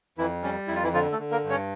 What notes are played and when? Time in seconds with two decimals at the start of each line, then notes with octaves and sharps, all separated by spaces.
0.18 F2 E3 E4
0.43 G3 C#4
0.68 F2 E4
0.76 F4
0.83 E3 E4
0.93 D3 F3 F4
1.12 A3 A4
1.19 D3
1.31 A#3 A#4
1.44 G2
1.50 C#4 C#5